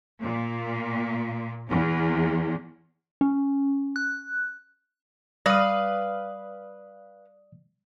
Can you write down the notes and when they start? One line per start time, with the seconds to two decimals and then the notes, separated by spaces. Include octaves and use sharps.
0.22 A#2
1.68 E2
3.21 C#4
3.96 F#6
5.46 G3 B4 D5 F5 D#6